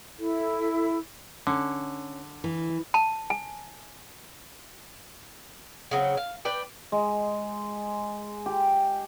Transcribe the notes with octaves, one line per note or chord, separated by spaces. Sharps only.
E4 A4
D3 C#4
E3
A5
G#5
C#3 F#3 B3 C4
F5
B4 D5 G5
G#3
G4